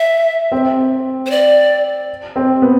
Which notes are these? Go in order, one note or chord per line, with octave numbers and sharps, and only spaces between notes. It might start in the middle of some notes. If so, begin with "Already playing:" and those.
Already playing: E5
C4
C5
D5
C4
B3